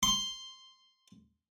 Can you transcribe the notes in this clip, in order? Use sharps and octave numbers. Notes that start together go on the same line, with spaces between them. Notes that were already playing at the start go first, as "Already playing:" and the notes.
C6